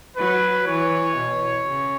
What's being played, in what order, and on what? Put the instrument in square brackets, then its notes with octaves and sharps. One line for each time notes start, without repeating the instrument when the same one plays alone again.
[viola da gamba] F#3 [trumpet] B4
[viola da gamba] E3 [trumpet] C#5
[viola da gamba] B2
C#3